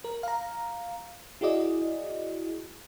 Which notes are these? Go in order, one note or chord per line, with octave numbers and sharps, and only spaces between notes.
A#4
F5 A#5
E4 F#4 G#4 D5 D#5